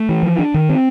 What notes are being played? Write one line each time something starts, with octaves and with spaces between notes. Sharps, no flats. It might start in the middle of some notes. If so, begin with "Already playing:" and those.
Already playing: A3
E3
F3
D4
D#3
C4